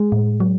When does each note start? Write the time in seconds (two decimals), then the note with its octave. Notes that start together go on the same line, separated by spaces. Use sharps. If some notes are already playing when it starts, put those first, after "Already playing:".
Already playing: G#3 G#4
0.12 A2
0.40 F#3